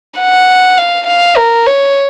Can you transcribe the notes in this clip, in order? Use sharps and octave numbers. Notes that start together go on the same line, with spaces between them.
F#5
F5
F5
A#4
C#5